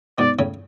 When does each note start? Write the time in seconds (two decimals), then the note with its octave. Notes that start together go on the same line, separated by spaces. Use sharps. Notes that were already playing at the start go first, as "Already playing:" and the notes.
0.18 G#2 B2 D5
0.39 A2 C#3